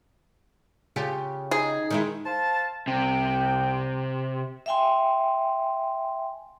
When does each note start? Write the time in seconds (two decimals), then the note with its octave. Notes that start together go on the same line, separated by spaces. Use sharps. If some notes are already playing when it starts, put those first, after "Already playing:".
0.96 C#3 F4 G4
1.51 D#4 G#4
1.91 D#3 G#3 E4
2.25 C5 F5 A5
2.88 C2 C3 G5
4.66 E5 F5 G5 G#5 C6